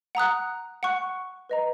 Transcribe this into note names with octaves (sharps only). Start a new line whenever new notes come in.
F#5 A#5 D#6 F#6
F#5 C#6 F#6
B4 D#5 A#5